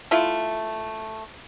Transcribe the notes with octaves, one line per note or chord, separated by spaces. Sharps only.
A3 E4 F4